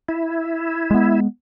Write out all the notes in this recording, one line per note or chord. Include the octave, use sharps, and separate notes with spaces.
E4
G#3 B3